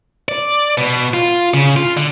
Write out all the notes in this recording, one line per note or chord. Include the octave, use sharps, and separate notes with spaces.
D5
B2
F4
C#3
F4
D3